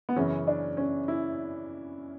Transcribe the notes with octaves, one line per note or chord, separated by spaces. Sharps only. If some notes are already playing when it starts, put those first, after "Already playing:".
B3
F#2 C#3 E3 C#4
D4
C#4
E4